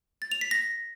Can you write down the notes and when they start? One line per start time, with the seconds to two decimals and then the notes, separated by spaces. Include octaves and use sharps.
0.22 A6
0.32 F7
0.41 B6
0.51 A#6